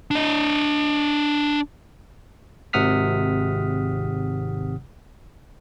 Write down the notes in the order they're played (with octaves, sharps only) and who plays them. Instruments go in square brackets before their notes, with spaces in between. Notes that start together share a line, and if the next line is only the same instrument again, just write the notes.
[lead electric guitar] D4 D#5
[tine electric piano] G#1 C3 F#5 D#6 F6 B6